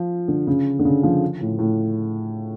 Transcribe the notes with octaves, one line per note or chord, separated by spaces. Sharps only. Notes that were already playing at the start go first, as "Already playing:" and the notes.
Already playing: F3
D3
C#3
D3
C#3
F3
A2
A2